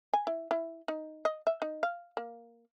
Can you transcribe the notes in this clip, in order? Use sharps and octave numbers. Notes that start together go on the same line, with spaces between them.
G#5
E4
E4
D#4
D#5
E5
D#4
F5
A#3